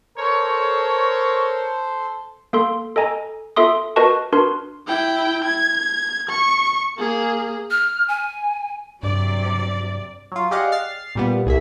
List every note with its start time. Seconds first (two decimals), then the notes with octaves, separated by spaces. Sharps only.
0.17 A4 A#4 C5 C#5
2.53 A#3 A4 C6
2.96 A4 D#5 G#5 A#5
3.56 F4 A4 E5 C6 D#6
3.96 F#4 A#4 B4 D#5 A5 C#6
4.33 D4 F#4 A#4 B4 C6
4.87 E4 G5
5.44 G#6
6.29 C#6
6.98 A#3 G#4
7.71 F6
8.08 G#5
9.03 G2 C3 F#3 D5
10.32 F#3 F4
10.51 G4 G#4 D5 D#5 F5 F#5
10.72 F6 A6 C7
11.15 A#2 G3 B3
11.46 C2 G#4 E5